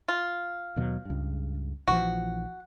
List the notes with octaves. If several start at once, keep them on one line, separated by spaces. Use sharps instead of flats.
F4
D#2 B2 F#3
C#2 G2
A#1 E3 F3 F#4